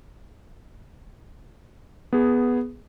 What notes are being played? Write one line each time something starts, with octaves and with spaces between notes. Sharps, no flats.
B3 G#4